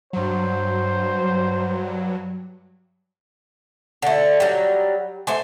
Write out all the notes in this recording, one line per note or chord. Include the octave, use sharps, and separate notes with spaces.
G2 F#3 C5
D3 A3
F#3 G3
A3 C5 G#5